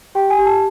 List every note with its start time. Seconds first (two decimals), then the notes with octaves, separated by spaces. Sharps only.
0.15 G4 G5
0.30 G#5
0.39 G4
0.46 A5